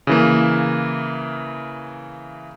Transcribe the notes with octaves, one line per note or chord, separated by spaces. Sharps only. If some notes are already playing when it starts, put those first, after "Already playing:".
C#3 E3 A#3